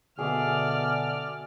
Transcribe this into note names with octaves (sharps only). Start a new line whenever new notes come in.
B2 D3 G#4 D5 E5 D6 F6